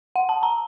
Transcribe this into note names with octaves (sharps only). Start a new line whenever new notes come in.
F#5
A5
A#5